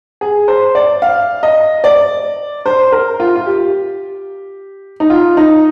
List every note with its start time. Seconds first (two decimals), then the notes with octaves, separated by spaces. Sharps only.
0.21 G#4
0.48 C5
0.75 D5
1.02 F5
1.43 D#5
1.84 D5
2.66 C5
2.92 A#4
3.20 F4
3.36 F4
3.46 G4
5.00 D#4
5.10 F4
5.37 D#4